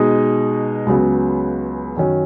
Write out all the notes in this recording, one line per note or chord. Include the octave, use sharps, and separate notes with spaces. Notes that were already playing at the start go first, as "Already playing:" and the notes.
Already playing: B2 G#3 D#4
C#2 C#3 F#3 B3
F#2 D#3 F#3 C#4